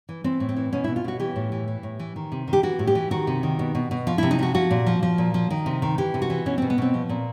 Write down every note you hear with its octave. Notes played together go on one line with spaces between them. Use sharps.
E3
E3 C4
A2
C4
E3
B2 C#4
B2 E4
F4
B2 F#4
E3 G4
A2
E3
E3
A2
E3
D#3
C3
D#3
G4
E3 F#4
A2
G4
E3
D#3 F#4
C3
D#3
B2
B2
B2
F3 F4
C3 E4
D#4
F3 F#4
F3 F#4
A#2
F3
F3
A#2
F3
D#3
C3
D#3
E3 G4
C3
F#4
E3
B2 C#4
B2 C4
B3
B2 C4
F3
A#2